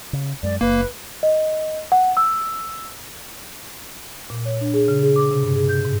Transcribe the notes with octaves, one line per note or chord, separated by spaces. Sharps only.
C#3
F#2 G#3 D5
F#1 A#3 B4
D#5
F#5
E6
A#2
C#5
D4
G#4
C#3
G#4
D6
C3
G2
G#4
G6
G#2